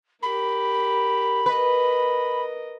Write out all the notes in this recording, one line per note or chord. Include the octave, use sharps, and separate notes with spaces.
G4 A#4 B5
A#4 B4 D#5